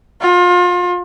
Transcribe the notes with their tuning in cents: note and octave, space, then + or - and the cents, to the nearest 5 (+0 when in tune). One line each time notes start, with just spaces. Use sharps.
F4 +30